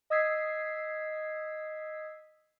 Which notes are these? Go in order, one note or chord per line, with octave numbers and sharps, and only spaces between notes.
D#5 D#6 E6 G#6 B6 C7